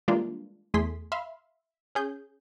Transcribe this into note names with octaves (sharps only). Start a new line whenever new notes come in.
E3 G3 G#3 A#3 D4 F4
E2 A3 G#4 C6 B6
E5 F5 B5 C6
C#4 G#4 G6